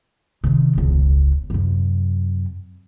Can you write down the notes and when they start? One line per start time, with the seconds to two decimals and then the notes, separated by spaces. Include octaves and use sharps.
0.44 C3 D#3
0.75 E1 C#2
1.50 F#2 C3